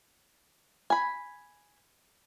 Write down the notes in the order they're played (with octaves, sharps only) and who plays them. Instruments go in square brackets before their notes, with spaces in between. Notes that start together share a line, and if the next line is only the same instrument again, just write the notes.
[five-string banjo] G#5 B5